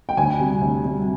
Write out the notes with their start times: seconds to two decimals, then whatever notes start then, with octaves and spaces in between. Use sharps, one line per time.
0.09 G5
0.17 D2 G#5
0.39 C3 G3
0.61 D2
0.84 C3 G3